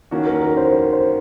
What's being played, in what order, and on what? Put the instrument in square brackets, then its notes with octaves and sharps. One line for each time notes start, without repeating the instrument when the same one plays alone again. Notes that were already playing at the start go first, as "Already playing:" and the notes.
[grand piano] D#3 A#3 C#4 F#4
[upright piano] A#4
A#4
C5
C5
C5